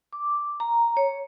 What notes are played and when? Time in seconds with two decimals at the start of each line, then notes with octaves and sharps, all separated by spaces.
0.13 D6
0.60 A#5
0.97 C#5